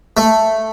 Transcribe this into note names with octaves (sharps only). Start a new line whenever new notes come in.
A3